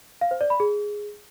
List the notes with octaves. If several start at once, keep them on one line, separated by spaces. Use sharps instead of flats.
F5
C5
D5
B5
G#4